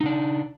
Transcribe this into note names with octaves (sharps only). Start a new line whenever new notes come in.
C#3 D4 D#4